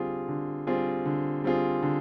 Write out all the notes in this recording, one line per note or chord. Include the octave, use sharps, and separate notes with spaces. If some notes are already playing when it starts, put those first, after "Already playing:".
Already playing: D3 G3 C4 F4 G#4
D3
G3 C4 F4 G#4
D3
G3 C4 F4 G#4
D3